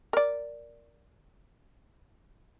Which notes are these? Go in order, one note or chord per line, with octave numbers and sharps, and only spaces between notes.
A#4 D5